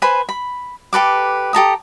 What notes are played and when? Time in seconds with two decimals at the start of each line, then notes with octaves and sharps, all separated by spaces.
0.02 B4 C5 G#5 B5
0.29 B5
0.93 G4 A4 B4 D6
1.53 G4 A4 A#5 D#6